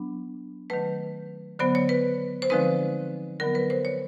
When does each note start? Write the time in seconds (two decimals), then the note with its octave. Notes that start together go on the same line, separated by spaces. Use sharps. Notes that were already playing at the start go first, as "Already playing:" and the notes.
Already playing: F#3 B3 D4
0.70 D#3 F#3 A3 B4
1.59 D3 F#3 B3 C5
1.75 C#5
1.89 B4
2.42 C5
2.50 D3 F3 G#3 C4 D#4 B4
3.40 D3 F#3 B3 A#4
3.55 B4
3.70 C5
3.85 C#5